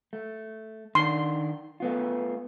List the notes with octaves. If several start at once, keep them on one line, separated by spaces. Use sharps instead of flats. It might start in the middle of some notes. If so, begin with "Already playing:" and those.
A3
D#3 D4 C6
A3 B3 F4